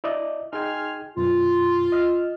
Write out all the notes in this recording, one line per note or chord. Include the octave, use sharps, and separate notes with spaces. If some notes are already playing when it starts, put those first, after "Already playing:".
E4 D5 D#5
D#4 G#4 G5 G#5 C6 F6
F#2 B2 F4
D#5 F6